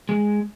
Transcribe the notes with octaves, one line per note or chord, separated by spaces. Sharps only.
G#3